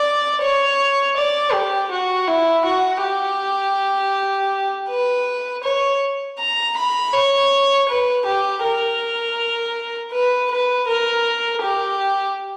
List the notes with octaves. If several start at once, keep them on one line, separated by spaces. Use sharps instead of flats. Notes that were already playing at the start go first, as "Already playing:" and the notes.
Already playing: D5
C#5
D5
G4
F#4
E4
F#4
G4
B4
C#5
A#5
B5
C#5
B4
G4
A#4
B4
B4
A#4
G4